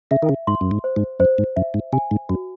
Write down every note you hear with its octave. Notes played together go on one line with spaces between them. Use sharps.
C#3 E5
D#3
C#3
G#2 C6
F#2
G#2
C5
G#2
F#2 C5
G#2
F#2 E5
G#2
C3 G#5
G#2
F#2 F#4